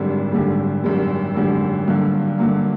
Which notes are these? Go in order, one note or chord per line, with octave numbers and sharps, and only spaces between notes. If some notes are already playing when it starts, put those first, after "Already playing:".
Already playing: G#1 F#2 D3 G3
G#1 F#2 D3 G3
G#1 F#2 D3 G3
G#1 F#2 D3 G3
G2 D3 F#3 A#3
G2 D3 F#3 A#3